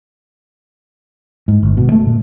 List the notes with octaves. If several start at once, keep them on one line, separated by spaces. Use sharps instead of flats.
G#2
G1
B2
A3
A#2